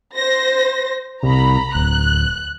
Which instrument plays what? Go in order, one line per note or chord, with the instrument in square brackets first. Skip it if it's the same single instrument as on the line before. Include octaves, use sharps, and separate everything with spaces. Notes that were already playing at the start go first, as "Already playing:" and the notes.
[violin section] C5 A#6
[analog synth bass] C2 [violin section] A#5 B5
[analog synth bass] D1 [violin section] F#6